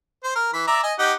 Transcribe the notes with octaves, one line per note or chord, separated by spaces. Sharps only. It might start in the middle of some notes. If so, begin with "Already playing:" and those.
C5
A#4
E3 B5
D5 E5 A#5
D#5 G#5
D#4 G4 F#5